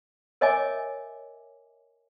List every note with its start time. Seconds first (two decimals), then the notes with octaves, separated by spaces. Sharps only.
0.41 A#4 C#5 D#5 E5 G#5 D6